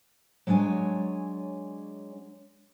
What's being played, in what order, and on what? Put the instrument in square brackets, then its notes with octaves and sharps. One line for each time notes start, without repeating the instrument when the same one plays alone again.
[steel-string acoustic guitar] F#3 G#3 D4 C#5 G#5